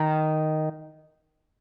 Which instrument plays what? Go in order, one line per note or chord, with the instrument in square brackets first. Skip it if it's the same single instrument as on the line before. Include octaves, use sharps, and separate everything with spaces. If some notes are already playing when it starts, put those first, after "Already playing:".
Already playing: [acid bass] D#3